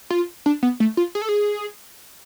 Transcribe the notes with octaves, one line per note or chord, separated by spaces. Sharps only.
F4
D4
B3
A3
F4
G#4
A4
G#4